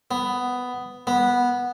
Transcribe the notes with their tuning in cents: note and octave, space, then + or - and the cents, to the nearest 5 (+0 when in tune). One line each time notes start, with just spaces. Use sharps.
B3 +10
B3 -10